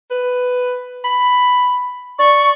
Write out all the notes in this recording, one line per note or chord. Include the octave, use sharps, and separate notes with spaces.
B4
B5
D5 C#6